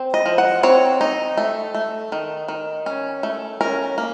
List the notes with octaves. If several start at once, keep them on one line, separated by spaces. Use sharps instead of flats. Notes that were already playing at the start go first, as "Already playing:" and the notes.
Already playing: C4
D#5
F3
F#5
C4 C#5
D#4
A3
A3
D#3
D#3
C#4
A3
C#4 A#4
A#3